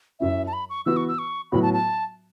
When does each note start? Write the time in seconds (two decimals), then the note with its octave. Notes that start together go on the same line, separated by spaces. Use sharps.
0.20 F#2 F#3 C#4 E4 E5
0.47 A5
0.53 B5
0.70 C#6
0.86 E3 B3 F#4 E6
0.97 C#6
1.08 E6
1.19 C#6
1.52 A2 F#3 B3 F#4 B5
1.62 A5
1.73 A5